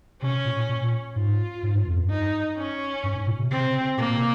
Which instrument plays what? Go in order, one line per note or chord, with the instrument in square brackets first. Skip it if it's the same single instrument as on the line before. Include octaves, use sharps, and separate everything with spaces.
[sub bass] C3 [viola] C#4
[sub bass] A#2
A#2
[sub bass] G#2 [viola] F4
[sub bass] G#2
G2
F2
G2
[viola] D#4
C#4
[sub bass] G2
G#2
A#2
C3
[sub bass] C#3 [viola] C4
[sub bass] C3
C#3
[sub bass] A#2 [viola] A#3
[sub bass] C3